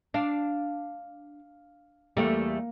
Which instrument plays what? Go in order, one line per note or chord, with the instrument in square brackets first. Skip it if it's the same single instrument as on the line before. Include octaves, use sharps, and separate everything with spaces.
[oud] D4 [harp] F5
[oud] E2 G3 A3 [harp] A#3